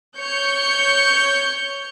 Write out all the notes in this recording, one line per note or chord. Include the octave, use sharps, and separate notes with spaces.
C#5 G6 C#7